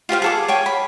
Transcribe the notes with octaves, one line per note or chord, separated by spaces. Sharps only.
F4 G4 C5 F5
G#4 A4 D6
C#5 G5 G#5
B5